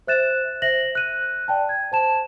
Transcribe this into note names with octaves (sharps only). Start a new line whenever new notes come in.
C5 E5 F#6 A6 E7
C5 E5 A#6 F#7
F#6 D#7
D5 G5 A5
G#6
C5 A5 E7